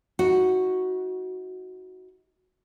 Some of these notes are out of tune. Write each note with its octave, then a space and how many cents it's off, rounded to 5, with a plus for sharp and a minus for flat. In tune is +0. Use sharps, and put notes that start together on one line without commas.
D#4 +40 F#4 -5